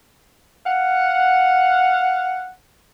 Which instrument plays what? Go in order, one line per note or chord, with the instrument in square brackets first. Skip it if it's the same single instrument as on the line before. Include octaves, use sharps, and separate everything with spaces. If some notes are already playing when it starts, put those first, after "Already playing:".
[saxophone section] F5 F#5